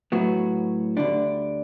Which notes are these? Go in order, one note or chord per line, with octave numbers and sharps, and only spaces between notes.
A2 F#3 B3 F#4
D2 D3 G3 D4